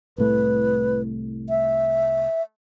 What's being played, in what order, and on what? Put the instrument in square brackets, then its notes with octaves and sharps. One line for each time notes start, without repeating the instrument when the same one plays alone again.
[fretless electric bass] C2 A2 A3 [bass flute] B4
[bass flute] E5